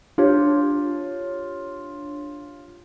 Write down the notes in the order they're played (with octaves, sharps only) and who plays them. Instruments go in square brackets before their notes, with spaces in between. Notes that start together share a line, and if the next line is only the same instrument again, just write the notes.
[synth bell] D4 G4 C#5 [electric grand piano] F4